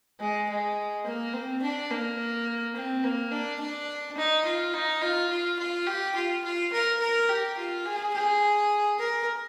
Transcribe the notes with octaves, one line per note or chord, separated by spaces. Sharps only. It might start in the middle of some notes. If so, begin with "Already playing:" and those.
G#3
G#3
A#3
C4
D4
A#3
C4
A#3
D4
D4
D#4
F4
D#4
F4
F4
F4
G4
F4
F4
A#4
A#4
G4
F4
G#4
G#4
A#4